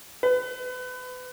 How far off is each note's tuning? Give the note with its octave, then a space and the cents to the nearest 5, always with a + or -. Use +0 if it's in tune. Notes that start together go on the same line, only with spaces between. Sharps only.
B4 +30